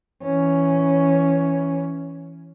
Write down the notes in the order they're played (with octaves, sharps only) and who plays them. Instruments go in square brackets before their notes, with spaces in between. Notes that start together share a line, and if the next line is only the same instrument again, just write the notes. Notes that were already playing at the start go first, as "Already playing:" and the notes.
[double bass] E3 C#4